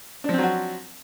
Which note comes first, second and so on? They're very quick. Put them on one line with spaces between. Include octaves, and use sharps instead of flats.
D4 F3 C4 F#3 F#4